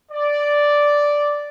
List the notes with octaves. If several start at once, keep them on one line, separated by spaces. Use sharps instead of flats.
D5